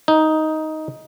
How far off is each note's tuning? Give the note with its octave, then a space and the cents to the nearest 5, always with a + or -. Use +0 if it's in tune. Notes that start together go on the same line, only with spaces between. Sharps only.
D#4 +10